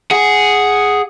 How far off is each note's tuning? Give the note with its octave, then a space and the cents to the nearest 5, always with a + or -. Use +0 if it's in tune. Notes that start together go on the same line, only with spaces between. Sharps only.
G#4 +0 F#5 +5